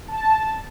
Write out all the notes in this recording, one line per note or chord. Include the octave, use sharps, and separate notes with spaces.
A5